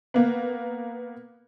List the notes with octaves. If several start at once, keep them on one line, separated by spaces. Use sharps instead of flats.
A#3 B3